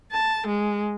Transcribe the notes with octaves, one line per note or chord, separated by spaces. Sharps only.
A5
G#3